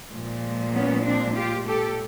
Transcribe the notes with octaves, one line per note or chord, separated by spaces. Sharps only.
A#2 F3 G#3
B3 C#4
C4 D4
F4 G4
G4 A4